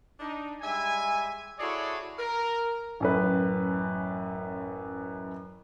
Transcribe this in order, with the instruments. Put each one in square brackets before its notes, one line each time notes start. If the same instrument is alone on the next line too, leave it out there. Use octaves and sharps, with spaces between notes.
[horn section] D4 D#4
G3 G#3 E5 G#5
E4 F#4 G#4 A4 C#5 D5
A#4
[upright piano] A1 F#2 B4